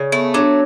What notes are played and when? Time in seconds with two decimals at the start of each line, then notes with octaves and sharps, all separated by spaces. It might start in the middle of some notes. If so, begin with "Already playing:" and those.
Already playing: C#3
0.12 A3 B3
0.34 F#3 D4